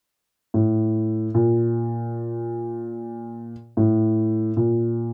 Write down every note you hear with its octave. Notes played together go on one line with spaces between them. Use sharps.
A2
A#2
A2
A#2